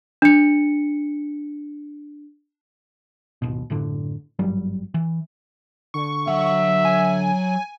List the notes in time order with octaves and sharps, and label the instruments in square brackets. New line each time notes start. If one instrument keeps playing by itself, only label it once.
[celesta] D4 C#7
[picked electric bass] D1 G#1 B2
F#1 A2 D3
G#1 G2 F#3 G3
E3
[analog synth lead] D3 [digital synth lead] C#6
[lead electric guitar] F#3 F#5 [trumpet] E5
[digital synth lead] G#5